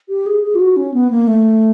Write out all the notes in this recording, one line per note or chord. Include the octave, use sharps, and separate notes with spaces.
G4
G#4
G#4
F4
F#4
C#4
B3
A#3
A3